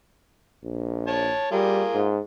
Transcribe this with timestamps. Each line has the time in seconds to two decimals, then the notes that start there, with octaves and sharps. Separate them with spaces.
0.64 A#1
1.07 C#5 A5
1.51 G3 A#3 F4 G#4
1.94 G#2